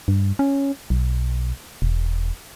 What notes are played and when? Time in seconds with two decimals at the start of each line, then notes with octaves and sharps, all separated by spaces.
0.08 G2
0.39 C#4
0.90 B1
1.82 E1